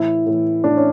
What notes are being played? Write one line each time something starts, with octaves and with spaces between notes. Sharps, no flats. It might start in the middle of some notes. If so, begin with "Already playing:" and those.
Already playing: A2 E3 E4
A2 E3
A2 E3 D4
C#4